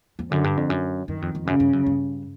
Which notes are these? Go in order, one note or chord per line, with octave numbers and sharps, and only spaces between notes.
F2
F#2 D3
G2
F2
F#2
F#2 D#3
F2
F2
F#2 C#3
G2
F#2
G2